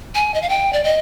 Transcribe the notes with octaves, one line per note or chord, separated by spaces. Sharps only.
G#5
D#5
F5
G5
D5
D#5